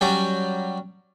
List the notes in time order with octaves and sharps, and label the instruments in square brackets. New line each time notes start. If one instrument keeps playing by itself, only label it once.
[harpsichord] F#3 G3 C#4 F#4 D5 G5